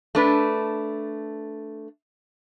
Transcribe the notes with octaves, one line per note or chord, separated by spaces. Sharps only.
A3 D4 B4